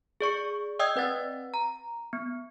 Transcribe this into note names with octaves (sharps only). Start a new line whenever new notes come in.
G#4 D5 C#6 C#7
D5 D#5 G5 D#6 E6 G#6
C4 B4 F#5 A6
A#5
B3